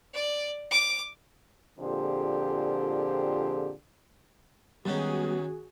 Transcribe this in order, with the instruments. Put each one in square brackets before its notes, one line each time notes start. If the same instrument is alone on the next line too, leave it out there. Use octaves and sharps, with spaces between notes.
[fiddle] D5
D6
[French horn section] F2 A#2 D3 G4 G#4 C5
[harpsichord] F#2 D#3 C#4 [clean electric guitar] G3 G#3 B3 [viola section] F#4 G#4